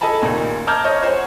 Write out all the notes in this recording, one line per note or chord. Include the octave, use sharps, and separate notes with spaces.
A4 D#5 G#5 A5 B5
F#1 D#2 A#2 D#4
A5 A#5 D6 F6 G6 G#6
C#5 D#5
C5 C#5 F#5 G#5